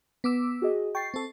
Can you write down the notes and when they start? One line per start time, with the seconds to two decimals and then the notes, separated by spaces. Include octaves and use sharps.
0.24 B3 D6 E6
0.62 F#4 G#4 D#5
0.95 G5 C#6 A6 C7
1.14 C4 A4